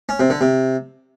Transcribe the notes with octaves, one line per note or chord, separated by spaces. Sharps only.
C#4
C3
D3
C3